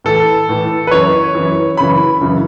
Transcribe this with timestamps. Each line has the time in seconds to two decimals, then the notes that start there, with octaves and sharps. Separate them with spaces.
0.04 A2 E3 A4
0.49 A2 E3
0.87 B4
0.91 F#2 E3 C#5
1.35 F#2 E3
1.77 F#2 C#3 E3 B5
2.21 F#2 C#3 E3